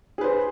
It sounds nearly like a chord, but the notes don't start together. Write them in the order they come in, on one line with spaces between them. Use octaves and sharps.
G#4 B4 C5